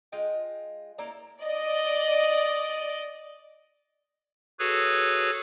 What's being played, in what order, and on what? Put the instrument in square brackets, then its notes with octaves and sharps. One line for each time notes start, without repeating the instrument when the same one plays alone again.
[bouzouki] G#3 F4 D#5 G5
A#3 E4 D5 A#5
[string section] D5 D#5
[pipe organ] F#4 G#4 A4 B4 C#5